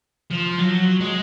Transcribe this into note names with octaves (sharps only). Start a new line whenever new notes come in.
F3
F#3
G#3